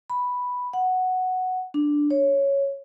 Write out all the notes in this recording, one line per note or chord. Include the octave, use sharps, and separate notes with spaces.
B5
F#5
D4
C#5